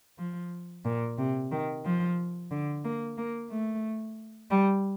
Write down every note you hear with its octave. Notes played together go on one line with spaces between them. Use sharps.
F3
A#2
C3
D#3
F3
D3
A#3
A#3
A3
G3